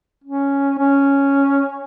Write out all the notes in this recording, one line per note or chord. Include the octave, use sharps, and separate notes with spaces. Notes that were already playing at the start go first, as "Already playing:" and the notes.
C#4
C#4